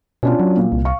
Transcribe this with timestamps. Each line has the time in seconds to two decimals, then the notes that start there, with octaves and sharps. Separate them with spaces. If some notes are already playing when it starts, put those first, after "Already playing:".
0.23 B2 C#4 D4 F4
0.40 F#3
0.57 A#2
0.72 C2
0.85 F5 C#6